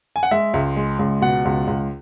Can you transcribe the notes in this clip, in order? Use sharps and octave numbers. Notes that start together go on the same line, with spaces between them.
G#5
F#5
G#3 E5
C#2
G#3
C#2
B2 F#5
C#2
C#2